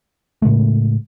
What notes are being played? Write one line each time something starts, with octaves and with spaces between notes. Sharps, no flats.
A2 C#3 G#3 A3